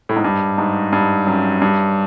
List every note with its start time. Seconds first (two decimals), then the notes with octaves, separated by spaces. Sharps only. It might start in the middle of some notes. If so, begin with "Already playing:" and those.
0.09 A2
0.16 G#2
0.24 G2
0.58 G#2
0.92 G2
1.27 F#2
1.61 G2